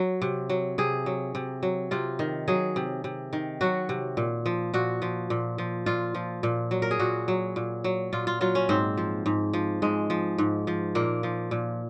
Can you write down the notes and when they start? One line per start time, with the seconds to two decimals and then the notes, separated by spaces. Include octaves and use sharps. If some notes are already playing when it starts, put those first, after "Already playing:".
Already playing: F#3
0.22 C3
0.49 F#3
0.78 C3 G#4
1.06 F#3
1.35 C3
1.63 F#3
1.91 C3 F4
2.19 D#3
2.48 F#3 G#4
2.76 C3
3.04 C3
3.33 D#3
3.61 F#3 F#4
3.89 C3
4.17 A#2
4.46 F3
4.74 A#2 F#4
5.02 F3
5.30 A#2
5.58 F3
5.86 A#2 F4
6.15 F3
6.43 A#2
6.71 F#3
6.82 A#4
6.91 G#4
6.99 A#2 F#4
7.28 F#3
7.56 A#2
7.84 F#3
8.13 A#2 F4
8.27 F4
8.41 F#3 F4
8.55 C#4
8.69 G#2 C4
8.97 F3
9.26 G#2
9.53 F3
9.82 G#2 G#3
10.10 F3
10.38 G#2
10.67 F3
10.95 A#2 A#3
11.23 F3
11.51 A#2